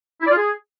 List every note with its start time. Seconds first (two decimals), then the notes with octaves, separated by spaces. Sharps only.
0.21 E4
0.26 D5
0.31 F4
0.36 G#4